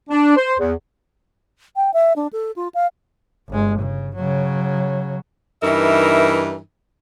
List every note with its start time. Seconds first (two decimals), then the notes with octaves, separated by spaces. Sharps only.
0.10 D4
0.36 C5
0.59 E2
1.76 G5
1.94 E5
2.16 D4
2.33 A4
2.56 F4
2.74 F5
3.49 G1 G#3
3.79 C#3
4.15 C#3 F#3
5.63 G2 E3 D#4 A#4 E5